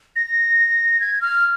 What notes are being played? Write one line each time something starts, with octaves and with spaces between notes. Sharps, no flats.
A#6
G#6
F6